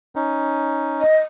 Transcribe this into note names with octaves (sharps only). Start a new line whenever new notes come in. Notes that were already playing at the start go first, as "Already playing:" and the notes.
C#4 D#4
D#5